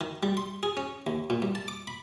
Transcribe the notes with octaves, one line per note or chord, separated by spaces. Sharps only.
D#3
G3
C6
G#4
C#4
D#2
A#2
G2
A5
D6
B5